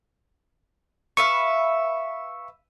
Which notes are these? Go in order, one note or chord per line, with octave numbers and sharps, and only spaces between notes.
B4 E5 F5 C#6